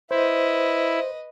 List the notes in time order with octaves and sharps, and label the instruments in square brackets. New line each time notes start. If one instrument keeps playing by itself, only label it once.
[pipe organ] E4 [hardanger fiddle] B4 D#5 [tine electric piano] C5